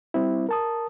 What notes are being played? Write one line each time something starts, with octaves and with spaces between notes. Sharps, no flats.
G3 C4 E4
A#4 A5 D#6